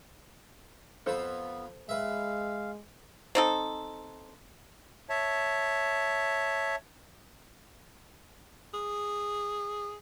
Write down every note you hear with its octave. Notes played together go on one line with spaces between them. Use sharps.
F2 B3 F4 A4 B4 C5
G#3 B4 E5 F5
C4 D#4 A4
C#5 E5 A5
G#4